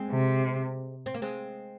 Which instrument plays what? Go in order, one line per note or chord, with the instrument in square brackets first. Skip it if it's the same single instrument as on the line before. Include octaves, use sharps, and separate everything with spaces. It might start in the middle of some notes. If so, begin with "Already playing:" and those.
Already playing: [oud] G#3 C4
[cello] C3
[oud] C4
A#3
G#3 C4